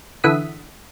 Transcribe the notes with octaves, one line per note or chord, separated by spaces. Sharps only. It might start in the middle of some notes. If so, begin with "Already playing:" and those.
D3 E3 E5 F#5 D#6 B6